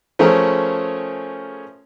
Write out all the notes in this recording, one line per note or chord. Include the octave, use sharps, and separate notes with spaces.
F3 A3 C#4 G#4 A#4 C#5